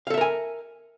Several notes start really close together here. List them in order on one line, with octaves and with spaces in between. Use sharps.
F5 A4 E5 A#4 G#5